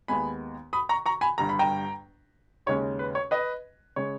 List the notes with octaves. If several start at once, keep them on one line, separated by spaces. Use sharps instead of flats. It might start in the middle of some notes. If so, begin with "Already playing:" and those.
D#2 D#3 G#3 B3 G#5 B5
B5 D#6
A#5 C#6
A#5 C#6
G#5 B5
G1 G2 G3 A#5
B5
G5 A#5
D#2 C#3 G#3 C#4 C#5
B4
C#5
B4 D#5
C#3 G#3 C#5